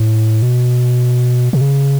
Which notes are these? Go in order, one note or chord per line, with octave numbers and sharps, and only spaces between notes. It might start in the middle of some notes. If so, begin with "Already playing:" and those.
Already playing: A2
B2
B2
C#3